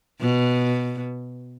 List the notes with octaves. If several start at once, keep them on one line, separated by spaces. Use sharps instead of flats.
B2